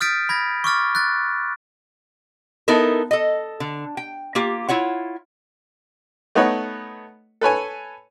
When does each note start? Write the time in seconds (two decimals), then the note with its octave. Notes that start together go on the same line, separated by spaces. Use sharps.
0.01 D#6 F6 G6 A6 B6 D7
0.29 B5 G#6 A#6
0.64 C#6 D6 F6 A6
0.95 F#6 A6
2.68 B3 D#4 E4 A4 A#4
3.11 A4 D#5
3.60 D3
3.97 G5
4.35 A#3 F4 G4
4.69 E4 F4 C#5 F#5
6.35 A3 B3 D#4 A4 C#5 F#5
7.41 A4 B4 C#5 G#5